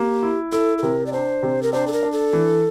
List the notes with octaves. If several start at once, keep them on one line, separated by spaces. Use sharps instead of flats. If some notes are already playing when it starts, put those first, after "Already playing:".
Already playing: A#3 G4
E4
E4 A4
A4
C3 A#4
D5
D4 C5
C3
A#4
D4 C5
A4
A#4
D4
A4
E3